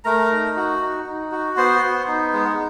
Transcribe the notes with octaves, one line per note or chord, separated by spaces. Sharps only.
A3 A#4 A#5
D#4
F#4
D#4
D#4
F#4
B3 C5 C6
B3
D#4
G#3